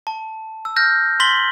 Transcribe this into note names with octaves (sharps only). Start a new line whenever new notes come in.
A5
E6
F6 G6 A#6
C6 A6 B6 F#7 G7